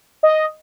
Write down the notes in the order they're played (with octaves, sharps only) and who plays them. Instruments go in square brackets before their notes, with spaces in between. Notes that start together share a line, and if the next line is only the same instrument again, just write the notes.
[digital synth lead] D#5